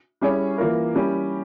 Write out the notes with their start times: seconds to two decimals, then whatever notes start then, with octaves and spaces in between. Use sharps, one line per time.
0.21 G3 C#4 E4 G#4 C#5
0.58 E3 A#3 F4 A#4
0.95 G3 C#4 E4 G4 A#4